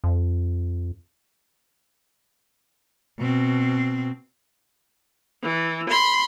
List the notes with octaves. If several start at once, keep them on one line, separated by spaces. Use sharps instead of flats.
F2
B2 C4
E3
B5 C6